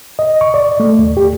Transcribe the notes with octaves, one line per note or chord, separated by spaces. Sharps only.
D#5
C#6
D5
A3
D#2
G4